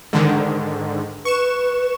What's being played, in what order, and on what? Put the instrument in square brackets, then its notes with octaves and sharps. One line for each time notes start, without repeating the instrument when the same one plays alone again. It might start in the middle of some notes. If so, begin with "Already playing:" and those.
[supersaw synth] G#2 D3 D#3
[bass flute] B4 [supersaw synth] C#6 E7